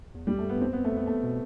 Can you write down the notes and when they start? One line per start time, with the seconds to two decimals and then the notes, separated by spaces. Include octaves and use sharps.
0.15 E2
0.27 F2 G3
0.38 A3
0.45 G2 B3
0.61 F2 C4
0.73 B3
0.76 F2
0.84 A3
0.92 F2 B3
1.07 A3
1.23 B2